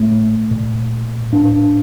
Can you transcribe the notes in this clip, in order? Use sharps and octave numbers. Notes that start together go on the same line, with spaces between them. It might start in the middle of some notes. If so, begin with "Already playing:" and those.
Already playing: A2 A3
A#2
A2 D4